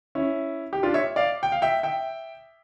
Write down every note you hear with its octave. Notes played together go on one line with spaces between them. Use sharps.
C#4 E4
G4
D4 F4
C#5 E5
D5 F5
G5
F5
E5 G5
E5 G5